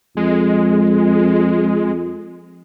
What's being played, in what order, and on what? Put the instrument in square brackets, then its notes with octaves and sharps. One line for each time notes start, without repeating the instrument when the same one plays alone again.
[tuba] F2 [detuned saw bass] G#3